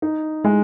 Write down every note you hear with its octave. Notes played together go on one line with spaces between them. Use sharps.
D#4
G#3